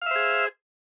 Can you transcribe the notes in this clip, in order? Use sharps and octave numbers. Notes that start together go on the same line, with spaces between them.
G#4 C5 E5 F5